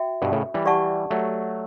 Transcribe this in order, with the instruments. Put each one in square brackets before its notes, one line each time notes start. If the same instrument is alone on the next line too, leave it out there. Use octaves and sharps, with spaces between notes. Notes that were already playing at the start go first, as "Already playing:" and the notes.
Already playing: [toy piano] F#4 E5 G5
[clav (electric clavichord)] G2 B2
A2 C#3
E3 G3
[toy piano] G4 D5 F#5 A5 C#6
[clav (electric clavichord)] F#3 A3